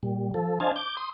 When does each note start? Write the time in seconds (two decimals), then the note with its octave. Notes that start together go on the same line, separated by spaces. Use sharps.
0.03 A#2 G3
0.34 F3 A4
0.60 D4 C5 D#5 F5 G#5 A5
0.76 D6 G6
0.97 C6 D#6